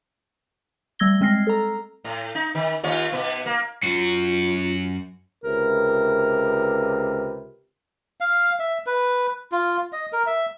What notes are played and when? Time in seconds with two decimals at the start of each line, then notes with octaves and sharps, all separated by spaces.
0.99 G3 A3 E6 G#6 A#6 G7
1.21 G#3 C4 F6 A#6 C7
1.47 A4 A#5
2.04 A2
2.35 D#4
2.55 D#3
2.83 D#2 F4 C#5
3.12 B2 B3
3.46 A#3
3.83 F#2 F4 F#4
5.44 C#2 C3 A#4 B4
8.20 F5
8.60 E5
8.86 B4
9.52 F4
9.93 D#5
10.13 A#4
10.26 E5